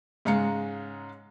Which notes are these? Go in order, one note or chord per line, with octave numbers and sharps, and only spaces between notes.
G#2 C#3 G#3 F5 A#5 C#7